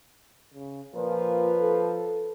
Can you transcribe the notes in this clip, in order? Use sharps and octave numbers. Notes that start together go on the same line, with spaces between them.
C#3
A#2 F3 B4
A4